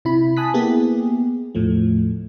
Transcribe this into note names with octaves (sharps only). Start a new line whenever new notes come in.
C3 E4 B5
G#5 A5 D#6 F#6 B6
A#3 B3 E4 G4 G#4
E2 A2 F3 A3